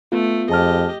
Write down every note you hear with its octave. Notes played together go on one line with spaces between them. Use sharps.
A3 B3 F4
F2 G4 G#4 D#5 A5 F6